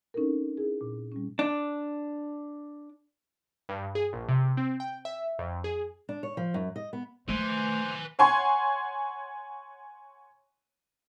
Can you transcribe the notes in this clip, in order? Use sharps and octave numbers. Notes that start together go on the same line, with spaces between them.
C4 C#4 D#4 E4 A4 A#4
E4 G#4
A#2
G3 C4 C#4
D4
G2
G#4
A#1
C3
C4
G5
E5
F2
G#4
D4
C#5
F3
F#2
D#5
B3
A3 B4 C5 G#5
C#5 F#5 G#5 C6 C#6